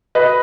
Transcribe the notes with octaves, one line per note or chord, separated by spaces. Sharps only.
B4 D#5